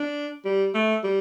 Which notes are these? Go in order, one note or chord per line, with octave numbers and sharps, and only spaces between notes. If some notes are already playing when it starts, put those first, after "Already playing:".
Already playing: D4
G3
A3
G3